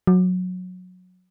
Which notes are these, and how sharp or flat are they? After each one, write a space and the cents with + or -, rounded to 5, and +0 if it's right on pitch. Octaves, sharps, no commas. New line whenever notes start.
F#3 -20